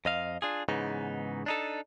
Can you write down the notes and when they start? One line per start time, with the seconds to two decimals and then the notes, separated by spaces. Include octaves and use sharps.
0.05 F2 D#5 F5
0.42 D4 F4 G#4
0.69 G#2 C#3 E3 B3 D#4
1.46 D4 D#4 A4